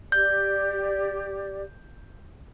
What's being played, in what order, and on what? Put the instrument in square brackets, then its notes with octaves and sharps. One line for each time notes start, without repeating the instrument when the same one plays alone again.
[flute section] G4 D5 [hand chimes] G6